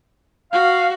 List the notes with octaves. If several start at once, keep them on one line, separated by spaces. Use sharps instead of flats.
F#4 F5